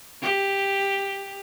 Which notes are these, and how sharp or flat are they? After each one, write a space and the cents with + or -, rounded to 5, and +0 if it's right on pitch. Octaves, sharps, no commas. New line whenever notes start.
G4 +10